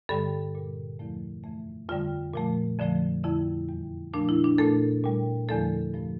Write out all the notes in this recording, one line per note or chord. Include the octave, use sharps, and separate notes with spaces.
G2 D3 G3 A4
A#2 G3
E2 D3 F3 A3
F2 E3 A3
F2 D3 G3 F4
A#2 F3 A3
F2 D3 F3 A3
F2 D3 G3 E4
E2 E3 G3
A#2 F3 A3 D4
E4
D4
A#2 A3 A4
A#2 G3
E2 D3 F3 A3 A4
G2 F3 A3